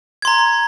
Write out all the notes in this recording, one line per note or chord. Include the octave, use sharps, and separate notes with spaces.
A#5 C6 G#6